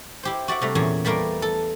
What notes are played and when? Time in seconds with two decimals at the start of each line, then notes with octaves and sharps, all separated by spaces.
0.23 E4 G4 C5
0.48 F#4 D5 E5 F#5
0.62 C3 G3 A3 A#5
0.75 E2 A#2 C#4 G#4
1.05 G3 A3 A#3 A#4 B4 D5
1.42 A4